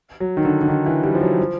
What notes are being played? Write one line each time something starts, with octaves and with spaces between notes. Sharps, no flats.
F#3
D#3
D3
D3
D#3
E3
G3
F3
F#3
F3